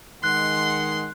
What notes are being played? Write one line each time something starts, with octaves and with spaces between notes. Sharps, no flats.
D#3 G#3 F#5 C6 F#6